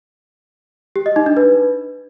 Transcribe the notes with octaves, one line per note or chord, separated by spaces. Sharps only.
G4
D#5
D#4
D4
B4